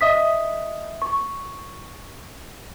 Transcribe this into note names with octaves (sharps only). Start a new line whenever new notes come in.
D#5 E5 D#6 B6
C#6